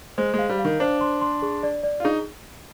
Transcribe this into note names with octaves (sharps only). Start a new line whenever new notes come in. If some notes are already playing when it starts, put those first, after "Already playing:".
G#3 C5
G#3
F5
G3
F5
D#3
D4 C5
C6
C6
G#4
D5
D5
F4
D#4 G#4